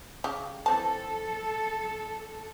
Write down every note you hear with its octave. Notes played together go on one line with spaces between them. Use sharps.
C#3 G4
E3 C4 A4 A5